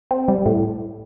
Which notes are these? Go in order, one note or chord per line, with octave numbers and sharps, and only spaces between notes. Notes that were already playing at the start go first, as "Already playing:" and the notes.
C4
G3
A2